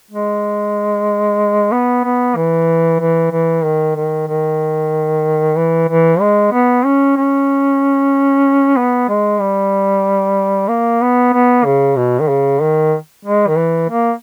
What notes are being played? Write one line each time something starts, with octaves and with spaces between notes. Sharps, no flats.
G#3
B3
B3
E3
E3
E3
D#3
D#3
D#3
E3
E3
G#3
B3
C#4
C#4
B3
G#3
G3
A#3
B3
B3
C#3
B2
D#3
C#3
D#3
G#3
D#3
E3
A#3